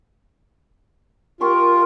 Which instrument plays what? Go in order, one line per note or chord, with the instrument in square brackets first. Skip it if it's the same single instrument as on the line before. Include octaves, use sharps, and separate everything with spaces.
[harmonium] F4 [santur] G4 C6 C#6 [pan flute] A#4